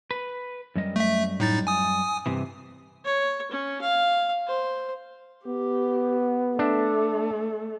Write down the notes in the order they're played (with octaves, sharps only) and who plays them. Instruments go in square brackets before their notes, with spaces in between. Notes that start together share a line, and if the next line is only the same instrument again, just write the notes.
[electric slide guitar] B4
F#2 G3 D#5
[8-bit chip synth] A3 E5
A2 D#4 A6
G#5 D#6
[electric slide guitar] G2 C3 E3
[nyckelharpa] C#5
C#4
F5
C5
[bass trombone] B3 [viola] G4
[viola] A3 [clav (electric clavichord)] D4 E5